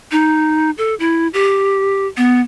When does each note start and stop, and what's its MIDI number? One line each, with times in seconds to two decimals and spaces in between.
0.11 0.71 63
0.78 0.95 69
1.00 1.28 64
1.34 2.06 67
2.17 2.41 59